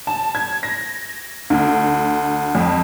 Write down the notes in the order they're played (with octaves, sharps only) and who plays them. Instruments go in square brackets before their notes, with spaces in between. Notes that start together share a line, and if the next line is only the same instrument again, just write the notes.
[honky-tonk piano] A5
G#6
A#6
D2
F2